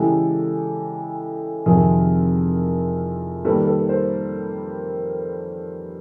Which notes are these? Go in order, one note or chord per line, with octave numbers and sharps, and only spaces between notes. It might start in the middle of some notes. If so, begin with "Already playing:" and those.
Already playing: C#3 E3 G#3 G4 A4
F2 C3 D#3 G#4 A#4
D#3 G3 A#3 A4 B4
A4 B4
A#4 C5